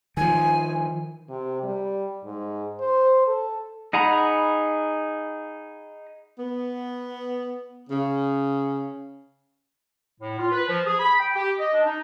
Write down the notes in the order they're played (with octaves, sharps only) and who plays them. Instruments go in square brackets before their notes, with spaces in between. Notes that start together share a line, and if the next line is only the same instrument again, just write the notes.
[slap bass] D#3 F3 [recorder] G#5
[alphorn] C3
G3
G#2
C5
A4
[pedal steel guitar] D#4 G#4 F#5 A#5 B5
[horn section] B3
C#3
[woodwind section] A2
F4
B4
F3
G#4
B5
G5
G4
D#5
D4
D#4